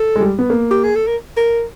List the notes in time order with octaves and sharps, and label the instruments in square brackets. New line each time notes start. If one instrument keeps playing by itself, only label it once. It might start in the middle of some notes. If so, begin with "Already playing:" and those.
Already playing: [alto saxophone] A4
[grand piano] G#3
G3
B3
A#3
[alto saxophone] G4
G#4
A4
A#4
A#4